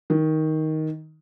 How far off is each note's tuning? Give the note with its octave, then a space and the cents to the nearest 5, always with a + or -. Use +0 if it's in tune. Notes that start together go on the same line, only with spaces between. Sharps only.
D#3 +10